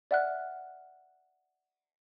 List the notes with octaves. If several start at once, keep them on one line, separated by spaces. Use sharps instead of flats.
D5 E5 F#5 F6 F#6